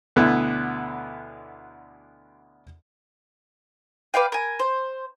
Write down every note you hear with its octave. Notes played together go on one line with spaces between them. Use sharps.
D2 B2 D3 B3 E4
B4 D5 F5 G5
A#4 G#5
C5